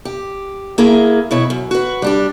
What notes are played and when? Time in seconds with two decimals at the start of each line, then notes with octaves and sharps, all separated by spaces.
0.05 G4
0.78 A#3 E4 G#4 A#4
1.31 B2 E4 C#5
1.50 F#2
1.71 F#4 B4
2.02 G3 D4 G4